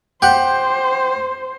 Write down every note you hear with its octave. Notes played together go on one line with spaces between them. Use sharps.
G4 C5 F#5